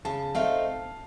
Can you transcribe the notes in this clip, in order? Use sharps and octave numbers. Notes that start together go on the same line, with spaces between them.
C#3 A5
A3 C4 D#4 F5